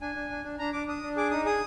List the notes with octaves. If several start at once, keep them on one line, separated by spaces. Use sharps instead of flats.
D4 G#5
D4
D4
D4
D4 A#5
D4 D6
D4 D#6
D4
G#4 D6
D#4 D#6
G#4 D#6